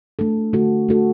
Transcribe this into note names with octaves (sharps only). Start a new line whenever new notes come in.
A3 D4 A4
D3 A3 F#4 A4
A3 D4 F#4 A4